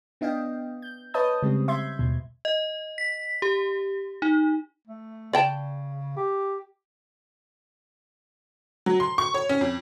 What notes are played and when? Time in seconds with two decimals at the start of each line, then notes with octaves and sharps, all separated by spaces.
0.21 B3 D4 D#5 F5 G5
0.82 G6
1.14 B4 C#5 D#5 A5 D#6 G6
1.43 C#3 G3 G#3 C4
1.68 E5 C6 G6 G#6
1.99 D#2 B2
2.45 D#5
2.98 B6
3.42 G4
4.22 D#4
4.87 A3
5.33 C#3 D5 G5 A5
6.17 G4
8.86 F#3
9.00 C6
9.18 C#6
9.34 C#5
9.49 C#4
9.61 F2